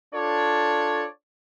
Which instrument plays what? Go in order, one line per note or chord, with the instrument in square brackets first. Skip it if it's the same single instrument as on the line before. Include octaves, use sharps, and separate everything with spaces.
[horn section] D4 F4 A4 C#5 D5